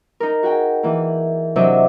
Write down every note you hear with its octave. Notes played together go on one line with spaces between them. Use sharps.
D#4 A#4
F#4 G#4 G5
E3 A#3
C3 F#3 D4 D#5 E5